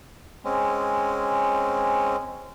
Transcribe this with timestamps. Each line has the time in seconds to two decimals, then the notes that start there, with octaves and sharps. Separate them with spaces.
0.45 G#3 C4 C#4